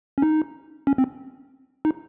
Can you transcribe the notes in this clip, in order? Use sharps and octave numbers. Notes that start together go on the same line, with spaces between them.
C#4
D#4
C#4
C4
D#4